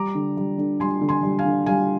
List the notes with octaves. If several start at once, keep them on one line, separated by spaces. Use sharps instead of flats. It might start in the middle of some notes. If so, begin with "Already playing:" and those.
Already playing: G3 A#5 D6
D3
G3
D3
G3 G#5 C6
D3
G#5 C6
G3
F5 G#5
D3
G3 F5 G#5